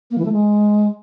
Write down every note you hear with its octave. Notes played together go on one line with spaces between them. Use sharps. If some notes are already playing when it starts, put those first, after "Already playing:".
A#3
E3
A3
G#3